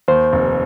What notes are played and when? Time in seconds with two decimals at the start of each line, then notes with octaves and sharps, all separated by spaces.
0.08 D#2 C5
0.33 F1